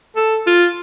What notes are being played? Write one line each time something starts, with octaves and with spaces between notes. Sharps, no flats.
A4
F4